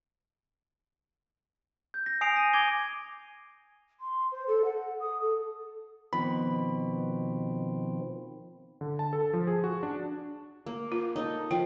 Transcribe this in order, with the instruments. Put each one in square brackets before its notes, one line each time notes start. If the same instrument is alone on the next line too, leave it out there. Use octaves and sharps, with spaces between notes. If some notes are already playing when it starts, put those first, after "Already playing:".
[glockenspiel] G6
A#6
G#5 D#6 C7 D7 F7
A#6 D#7
D6 G#6 G7
[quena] C6
C5
A4
F#5
D#6
A4
[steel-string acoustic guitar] B2 [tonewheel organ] D#3 F3 C4 [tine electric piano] B5
[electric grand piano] D3
A5
A4
F3
G#4
F#4
D4
[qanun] A#3
[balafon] F4
[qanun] D#4 A4
[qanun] F3 [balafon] G5